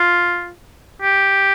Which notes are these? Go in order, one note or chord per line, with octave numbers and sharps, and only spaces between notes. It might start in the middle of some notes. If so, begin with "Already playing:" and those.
Already playing: F4
G4